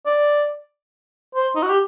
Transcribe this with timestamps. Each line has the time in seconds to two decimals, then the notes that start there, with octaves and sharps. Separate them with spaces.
0.06 D5
1.35 C5
1.56 D#4
1.63 F#4
1.70 G4